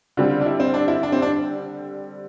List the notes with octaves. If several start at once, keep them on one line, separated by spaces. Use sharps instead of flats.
D3 G3 C4 F4
D4
E4
C4
D4
E4
D4
C4
D4